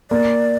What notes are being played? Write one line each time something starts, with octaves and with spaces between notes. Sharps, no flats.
A#3 D5